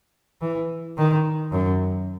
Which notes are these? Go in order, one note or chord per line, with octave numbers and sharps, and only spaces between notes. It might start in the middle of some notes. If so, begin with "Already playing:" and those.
E3
D#3
F#2